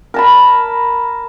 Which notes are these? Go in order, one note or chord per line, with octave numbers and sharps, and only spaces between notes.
A#4 A5 B5